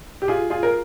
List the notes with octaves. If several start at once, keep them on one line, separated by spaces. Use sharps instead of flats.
G4
F4 G#4
F4 G#4
A#4